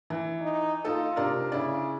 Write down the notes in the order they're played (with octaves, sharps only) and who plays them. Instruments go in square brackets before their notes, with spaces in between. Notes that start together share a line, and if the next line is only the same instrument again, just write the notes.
[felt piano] E3
[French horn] D#4
[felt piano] D#4 A4 [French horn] F4
[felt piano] C3 D4 A#4
[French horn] C#3 [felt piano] D4 E4